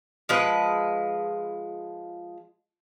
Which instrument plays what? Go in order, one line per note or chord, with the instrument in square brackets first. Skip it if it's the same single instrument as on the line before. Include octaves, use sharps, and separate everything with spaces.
[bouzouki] F3 G#3 B4